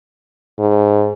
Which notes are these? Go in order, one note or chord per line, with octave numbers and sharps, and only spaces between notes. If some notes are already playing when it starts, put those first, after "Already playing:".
G#2